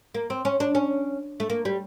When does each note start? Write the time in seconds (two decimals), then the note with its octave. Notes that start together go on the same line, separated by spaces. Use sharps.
0.15 A#3
0.30 C4
0.45 C#4
0.60 D4
0.75 C#4
1.40 A3
1.50 A#3
1.65 G3